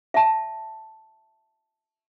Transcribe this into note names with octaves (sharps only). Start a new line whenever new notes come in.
E5 A5